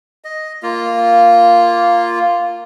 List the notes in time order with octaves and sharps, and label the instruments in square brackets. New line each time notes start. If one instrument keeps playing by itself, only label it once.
[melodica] D#5
A#3 F4